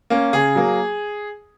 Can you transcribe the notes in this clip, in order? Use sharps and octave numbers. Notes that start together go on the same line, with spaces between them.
A#3 C#4
C#3 G#4
F#3 A#3